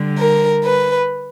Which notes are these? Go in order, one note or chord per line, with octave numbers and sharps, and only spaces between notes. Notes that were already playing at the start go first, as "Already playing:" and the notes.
Already playing: D3 G3
A#4
B4